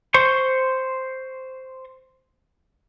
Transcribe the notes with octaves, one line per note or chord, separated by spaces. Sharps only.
C5 C6 C#6